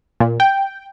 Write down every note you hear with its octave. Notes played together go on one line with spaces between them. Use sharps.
A#2
G5